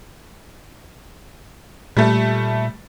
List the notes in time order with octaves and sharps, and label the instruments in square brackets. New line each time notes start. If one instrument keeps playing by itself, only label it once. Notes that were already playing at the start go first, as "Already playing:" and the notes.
[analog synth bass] A#2 [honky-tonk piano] G3 A3